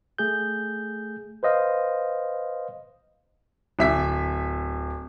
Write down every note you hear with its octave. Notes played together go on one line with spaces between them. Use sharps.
A3 G#4 G6
B4 C5 D#5 F5
D1 E5 B6